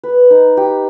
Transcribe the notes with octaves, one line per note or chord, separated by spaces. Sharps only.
B4
D#4
G4